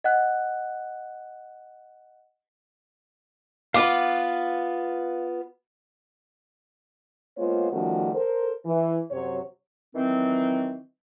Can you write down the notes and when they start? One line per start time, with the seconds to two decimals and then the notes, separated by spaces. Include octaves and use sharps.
0.04 D#5 F#5 F#6
3.74 B3 F4 B4 F5 D6
7.38 G#3 A#3 B3 F4 C5 C#5
7.72 D#3 F3 G3 A3 C#4 F#4
8.14 A4 A#4 C5
8.66 E3
9.11 F#2 C3 F#3 C5 C#5
9.95 D#3 E3 F#3 C4